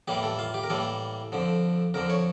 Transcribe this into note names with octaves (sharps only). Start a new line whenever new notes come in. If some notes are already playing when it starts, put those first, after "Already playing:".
A2 E3 G3 A#3 G4
A4
F4
G4
A#4
A2 E3 G3 A#3 A4
F2 D3 F3
F2 D3 F3 A#4
C#5